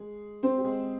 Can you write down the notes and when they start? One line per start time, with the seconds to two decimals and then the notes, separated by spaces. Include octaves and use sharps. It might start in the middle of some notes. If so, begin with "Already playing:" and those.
Already playing: G#3 G#4
0.43 C4 C5
0.58 G4
0.64 G#3 G#4